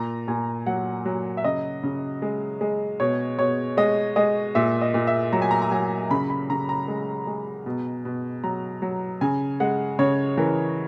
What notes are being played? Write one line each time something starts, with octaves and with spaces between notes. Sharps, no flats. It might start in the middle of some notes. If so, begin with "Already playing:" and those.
Already playing: A#2 A#5
A#2 G#5
F#3 F#5
F#3
E5
C#3 D#5
C#3
G#3
G#3
B2 C#5
B2 C#5
G#3 D#5
G#3 D#5
A#2 E5
D#5
A#2
E5
F#3 A#5
G#5
A#5
A#5
F#3 G#5
C#3 B5
B5
C#3 A#5
A#5
G#3
G#3
B2
B2
F#3 A#5
F#3
C#3 G#5
G#3 F#5
C#3 C#5
E3 A#4